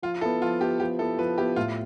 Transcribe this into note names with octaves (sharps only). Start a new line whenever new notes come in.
F3 F4
B3 E4 A4
F3 F4
B3 E4 G4
F3 G4
B3 E4 A4
F3 B4
B3 E4 G4
A2 F4